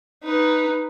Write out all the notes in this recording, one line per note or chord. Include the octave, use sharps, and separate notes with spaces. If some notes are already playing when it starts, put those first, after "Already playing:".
D#4 B4